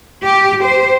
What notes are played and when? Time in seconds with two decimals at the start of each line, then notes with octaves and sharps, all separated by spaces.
0.21 G4
0.62 C5